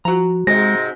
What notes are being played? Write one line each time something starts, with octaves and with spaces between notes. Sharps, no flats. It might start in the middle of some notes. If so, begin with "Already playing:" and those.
F3 F#4 A#5
G#2 C3 G#3 A#6